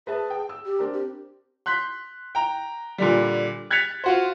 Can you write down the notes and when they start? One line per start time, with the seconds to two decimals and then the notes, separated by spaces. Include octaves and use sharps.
0.07 G#4 B4 E5 A5
0.30 G5
0.49 E6
0.65 G4
0.79 C4 D4 A#4
0.93 G4
1.66 C6 F#6 G6 B6
2.35 G5 A#5
2.98 A#2 D3 G3
3.71 F#6 G#6 A6 B6 C#7 F7
4.04 F4 F#4 C5